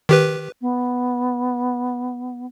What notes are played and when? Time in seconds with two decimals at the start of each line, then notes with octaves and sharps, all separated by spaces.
0.09 D#3 G4 B4
0.61 B3